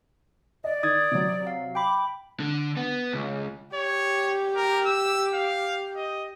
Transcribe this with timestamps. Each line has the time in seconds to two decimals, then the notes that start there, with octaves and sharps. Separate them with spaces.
0.64 D5 D#5
0.83 D#3 D#6 G#6 A6
1.12 C3 F#3
1.47 F5
1.75 G5 B5 D6
2.40 D3
2.77 B3
3.13 C#2
3.74 G4 C#5
4.56 A#4
4.86 E6
5.34 F5
5.96 D#5